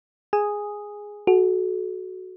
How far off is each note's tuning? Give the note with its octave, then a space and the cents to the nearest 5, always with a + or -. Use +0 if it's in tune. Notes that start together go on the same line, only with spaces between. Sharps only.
G#4 -5 G#5 -10 D#6 +0
F#4 +0 A4 -40